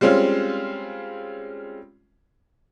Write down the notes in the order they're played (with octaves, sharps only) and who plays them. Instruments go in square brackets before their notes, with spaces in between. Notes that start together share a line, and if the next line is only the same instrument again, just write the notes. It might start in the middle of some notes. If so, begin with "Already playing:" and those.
[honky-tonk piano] G3 G#3 C4 C#4 F4